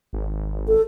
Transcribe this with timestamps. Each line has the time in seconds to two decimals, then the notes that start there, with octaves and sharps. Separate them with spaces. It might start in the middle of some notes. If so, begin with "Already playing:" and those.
0.13 G#1
0.68 A4